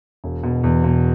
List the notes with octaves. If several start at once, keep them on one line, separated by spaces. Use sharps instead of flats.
E1
B2
E2
B2